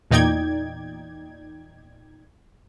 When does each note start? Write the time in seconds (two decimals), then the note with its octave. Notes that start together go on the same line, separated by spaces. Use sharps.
0.11 E2 A#2 D#4 D5 G5 G#6